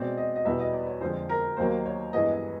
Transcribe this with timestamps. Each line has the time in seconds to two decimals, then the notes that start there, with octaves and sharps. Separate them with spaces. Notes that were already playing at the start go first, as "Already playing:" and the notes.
Already playing: B2 G#3 C4 D5
0.17 D#5
0.36 D#5
0.45 E2 B2 G3 B3 E5
0.60 D#5
0.73 D5
0.87 C#5
1.01 F2 D3 F3 G#3 C5
1.29 A#4
1.57 D#2 D#3 F#3 A#3 C5
1.86 C#5
2.13 G2 E3 G#3 B3 D#5
2.32 D#5